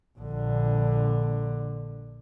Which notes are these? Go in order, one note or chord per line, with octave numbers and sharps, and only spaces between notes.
A#1 D3